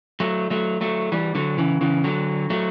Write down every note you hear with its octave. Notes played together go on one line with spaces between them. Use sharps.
F#3 A3
F#3 A3
F#3 A3
E3 G3
D3 F#3
C#3 E3
C#3 E3
D3 F#3
F#3 A3